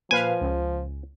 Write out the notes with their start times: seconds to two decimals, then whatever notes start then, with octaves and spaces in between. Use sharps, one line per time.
0.11 A#2 F3 B4 F5 G#5
0.41 C#2